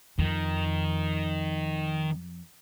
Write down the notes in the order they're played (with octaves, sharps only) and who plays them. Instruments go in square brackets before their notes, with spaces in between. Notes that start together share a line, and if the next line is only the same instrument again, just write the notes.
[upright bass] F2 [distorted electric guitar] D#3